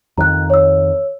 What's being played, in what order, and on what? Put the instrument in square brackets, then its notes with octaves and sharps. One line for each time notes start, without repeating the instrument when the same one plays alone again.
[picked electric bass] F2 D#3 [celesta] A#5 F#6
[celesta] C#5 E6